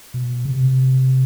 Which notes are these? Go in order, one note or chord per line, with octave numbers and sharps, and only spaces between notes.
B2
C#3
C3